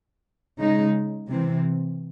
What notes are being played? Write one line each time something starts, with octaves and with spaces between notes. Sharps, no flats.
C#3 G#3 D#4
C3 E3 C4